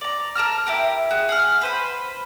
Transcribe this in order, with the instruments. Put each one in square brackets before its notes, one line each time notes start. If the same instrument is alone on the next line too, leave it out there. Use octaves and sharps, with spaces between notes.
[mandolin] D5 A#5
A#4 A5 A#5 F6
E4 G4 A#4
F#4 G#4
G#4 F#5 F6
B4 C5 B5